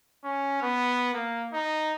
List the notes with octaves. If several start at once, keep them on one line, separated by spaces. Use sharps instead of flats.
C#4
B3
A#3
D#4